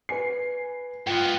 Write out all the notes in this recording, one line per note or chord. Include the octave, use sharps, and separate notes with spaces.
B4 G#5 C7
G#2 B3 F4 G5